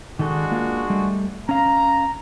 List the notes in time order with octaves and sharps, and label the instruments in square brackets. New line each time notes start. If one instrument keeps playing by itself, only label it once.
[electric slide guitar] D#3 D#4 A4 [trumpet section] G#3 D4 F#4
[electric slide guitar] A#3 F4
G3 A3
[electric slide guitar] C#4 F5 [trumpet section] A#5